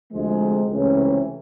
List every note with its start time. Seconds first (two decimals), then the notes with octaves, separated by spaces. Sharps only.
0.12 D2 C3 F3 G#3
0.70 C#2 C3 E3 A3 C#4